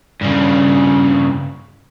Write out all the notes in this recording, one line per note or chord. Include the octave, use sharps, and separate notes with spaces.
G2 C#3